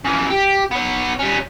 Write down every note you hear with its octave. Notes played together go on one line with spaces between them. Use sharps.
C#3 E3
G4
B3 C#5
G3 C#4